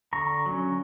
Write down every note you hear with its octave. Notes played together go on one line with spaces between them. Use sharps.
D3 A#5 C#6
F#3 C#4